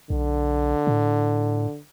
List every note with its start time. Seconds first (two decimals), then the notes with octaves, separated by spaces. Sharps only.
0.10 B1 D3
0.87 A2